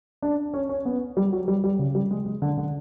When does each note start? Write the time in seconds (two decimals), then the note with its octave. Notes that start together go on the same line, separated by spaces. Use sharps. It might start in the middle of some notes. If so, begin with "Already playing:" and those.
0.22 D4
0.54 C#4
0.69 C#4
0.85 B3
1.17 G3
1.32 F#3
1.48 G3
1.64 G3
1.79 C#3
1.95 G3
2.11 G#3
2.26 G#3
2.42 D3
2.57 D3